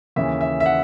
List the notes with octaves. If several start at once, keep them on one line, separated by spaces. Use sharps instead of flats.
D#2 C#3 E3 E5
E5
E5
F#5